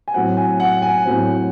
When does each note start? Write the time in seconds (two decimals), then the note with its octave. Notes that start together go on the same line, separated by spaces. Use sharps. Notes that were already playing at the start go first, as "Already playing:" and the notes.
0.08 G#5
0.14 A2 F#3 C4 F#5
0.37 G#5
0.60 F#5
0.82 G#5
1.05 A2 F#3 C4